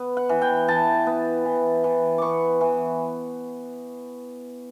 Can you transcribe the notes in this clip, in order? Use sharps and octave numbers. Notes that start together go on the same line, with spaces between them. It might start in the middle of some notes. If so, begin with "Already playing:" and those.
Already playing: B3
F#5
E3
G5
E3 A5
B3
E3
E3
B3 C#6 D6
E3